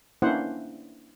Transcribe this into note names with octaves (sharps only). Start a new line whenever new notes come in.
A#3 C#4 D4 E4 C5 F#5